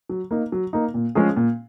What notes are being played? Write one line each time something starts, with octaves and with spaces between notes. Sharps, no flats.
F#3
A#3 D#4
F#3
A#3 D#4
A#2
F3 G#3 C#4 G#4
A#2